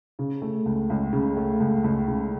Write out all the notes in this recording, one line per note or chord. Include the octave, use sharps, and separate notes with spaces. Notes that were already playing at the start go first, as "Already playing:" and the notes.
C#3
A3
C#2
C#2
C#3
A3
C#2
C#2
C#3